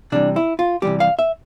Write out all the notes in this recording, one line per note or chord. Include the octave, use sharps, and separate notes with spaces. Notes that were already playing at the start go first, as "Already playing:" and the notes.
C3 E3 G3 D4
E4
F4
C3 E3 G3 G4
F5
E5